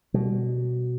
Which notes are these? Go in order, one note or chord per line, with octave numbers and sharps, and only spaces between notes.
B2 G3